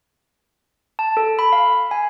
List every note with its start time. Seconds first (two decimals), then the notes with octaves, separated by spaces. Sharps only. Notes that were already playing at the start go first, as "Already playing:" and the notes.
0.99 A5
1.17 A4
1.39 B5
1.53 F5
1.91 G#5